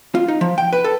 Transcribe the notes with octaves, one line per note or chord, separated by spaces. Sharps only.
F4
D#4
F3
G5
B4
A4